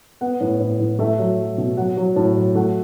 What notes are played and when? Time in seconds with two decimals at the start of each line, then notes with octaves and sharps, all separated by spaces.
0.21 B3 F#5
0.41 A2
0.61 A2
0.80 A2
0.99 A3 E5
1.19 F#3
1.38 F#3
1.58 B2
1.77 F#3 F#5
1.97 F#3
2.16 A2 A5
2.37 F#3
2.55 A3 F#5